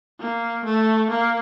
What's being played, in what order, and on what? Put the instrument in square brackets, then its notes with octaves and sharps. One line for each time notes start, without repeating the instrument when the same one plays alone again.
[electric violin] A#3
A3
A#3